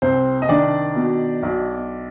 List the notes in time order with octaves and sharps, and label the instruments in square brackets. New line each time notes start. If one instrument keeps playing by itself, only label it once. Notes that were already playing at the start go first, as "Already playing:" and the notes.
[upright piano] C2 C4 C5
D#5
D#3 D4 D5
B2
B1